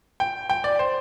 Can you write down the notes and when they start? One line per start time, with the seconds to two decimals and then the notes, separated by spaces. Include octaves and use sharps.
0.20 G5
0.49 G5
0.64 D5
0.79 C5